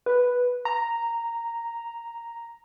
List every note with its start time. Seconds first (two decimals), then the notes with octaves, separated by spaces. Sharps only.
0.06 B4
0.65 A#5